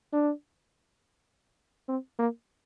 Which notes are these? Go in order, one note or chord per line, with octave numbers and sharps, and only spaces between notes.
D4
C4
A#3